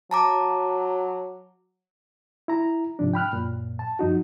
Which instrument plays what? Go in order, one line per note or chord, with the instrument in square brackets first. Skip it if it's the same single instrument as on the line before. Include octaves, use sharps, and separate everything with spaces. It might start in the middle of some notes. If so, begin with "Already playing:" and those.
[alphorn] F#3 [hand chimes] A5 A#5 D6
[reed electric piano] E4 A#5
G#2 C3 F3 D4
G5 B5 F6 F#6
F#2 A#2
A5
F#2 F3 D#4 F#4